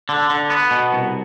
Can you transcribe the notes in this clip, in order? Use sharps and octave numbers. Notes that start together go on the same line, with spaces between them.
D3
D3
B3
B2
C2